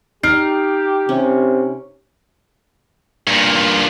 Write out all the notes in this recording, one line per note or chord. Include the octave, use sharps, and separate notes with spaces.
D#4 G4 F6 C7 D7
C3 C#4
G2 A#2